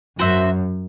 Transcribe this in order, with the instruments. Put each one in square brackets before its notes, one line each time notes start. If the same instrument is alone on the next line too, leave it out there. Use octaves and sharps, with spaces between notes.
[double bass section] F#2 [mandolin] F#4 C5 E5